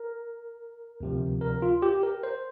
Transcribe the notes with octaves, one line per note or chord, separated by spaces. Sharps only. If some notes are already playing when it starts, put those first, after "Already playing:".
Already playing: A#4
D2 C3 F3
A#4
F4
G4
A#4
C5